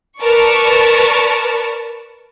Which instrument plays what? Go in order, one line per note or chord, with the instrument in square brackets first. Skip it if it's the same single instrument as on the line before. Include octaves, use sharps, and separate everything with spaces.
[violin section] A#4 B4 D5 A5 C#6